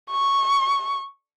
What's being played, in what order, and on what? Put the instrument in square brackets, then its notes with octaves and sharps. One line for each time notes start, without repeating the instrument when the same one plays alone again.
[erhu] C#6